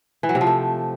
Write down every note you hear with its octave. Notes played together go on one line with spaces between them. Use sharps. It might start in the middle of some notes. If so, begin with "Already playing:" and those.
E3
F#3
C3
F3
A3